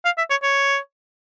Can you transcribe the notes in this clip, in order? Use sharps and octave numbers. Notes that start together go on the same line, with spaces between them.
F5
E5
C#5
C#5